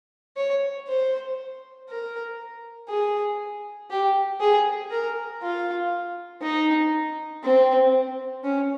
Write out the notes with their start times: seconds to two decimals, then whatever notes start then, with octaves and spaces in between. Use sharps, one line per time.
0.37 C#5
0.88 C5
1.89 A#4
2.89 G#4
3.91 G4
4.40 G#4
4.91 A#4
5.42 F4
6.42 D#4
7.43 C4
8.44 C#4